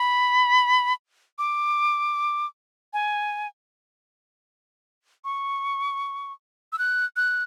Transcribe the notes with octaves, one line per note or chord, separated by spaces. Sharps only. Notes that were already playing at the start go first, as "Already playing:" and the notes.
Already playing: B5
D6
G#5
C#6
E6
F#6
F#6